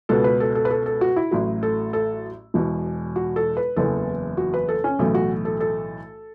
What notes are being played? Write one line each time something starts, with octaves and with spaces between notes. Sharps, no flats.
C#2 B2 B3 A4
B4
A4
A4
B4
A4
A4
F#4
E4
A1 A2 F#3
A4
A4
E1 E2 B2
F#4
A4
B4
F#1 E2 E3 B3 A4
F#4
B4
A4
C#4
B1 A2 E3 A3
F#4
A4
A4